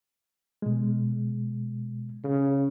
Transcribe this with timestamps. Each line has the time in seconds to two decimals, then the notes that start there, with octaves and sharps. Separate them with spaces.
0.62 B2 G#3
2.24 C#3